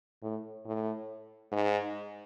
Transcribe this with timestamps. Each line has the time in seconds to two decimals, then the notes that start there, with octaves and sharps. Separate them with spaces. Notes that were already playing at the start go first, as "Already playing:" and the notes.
0.23 A2
0.66 A2
1.52 G#2